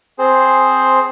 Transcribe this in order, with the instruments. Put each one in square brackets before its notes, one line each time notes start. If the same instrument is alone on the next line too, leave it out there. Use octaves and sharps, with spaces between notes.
[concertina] C4 G#4 C5